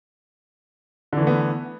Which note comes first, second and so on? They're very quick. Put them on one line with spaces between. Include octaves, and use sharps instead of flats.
D3 E3 A3 B3